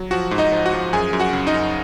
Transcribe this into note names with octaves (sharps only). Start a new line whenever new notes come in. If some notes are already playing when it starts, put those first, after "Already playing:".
Already playing: F#3
F3 F#4 F#5
G#2
D#4 D#5
F3
F#4 F#5
F3
F#2 G#4 G#5
F#2
F#4 F#5
C#3
D#4 D#5
F#2